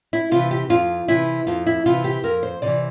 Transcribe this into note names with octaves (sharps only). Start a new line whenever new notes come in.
E4
C3 E3 F4
G4
F2 F4
C3 E3 E4
F2 F4
E4
C3 E3 F4
G4
F2 A#4
C5
C3 E3 D5